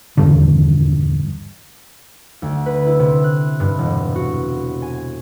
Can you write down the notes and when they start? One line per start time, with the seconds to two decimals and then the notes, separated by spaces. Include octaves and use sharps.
0.17 D#1 E2 G2 D3
2.42 D2
2.66 B4
2.87 E4
2.99 C3
3.24 F#6
3.60 G2
3.79 E1
4.15 F#4
4.82 G#5